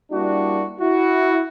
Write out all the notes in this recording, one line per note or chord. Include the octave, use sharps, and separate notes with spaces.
G3 A#3 D4 E4 F#4
E4 F#4